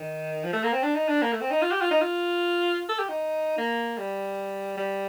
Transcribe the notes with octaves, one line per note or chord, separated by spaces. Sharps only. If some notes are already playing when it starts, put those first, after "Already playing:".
Already playing: D#3
F3
A3
A#3
C4
D4
D#4
D4
A#3
A3
C4
D#4
F4
G4
F4
D#4
F4
A4
G4
D#4
A#3
G3
G3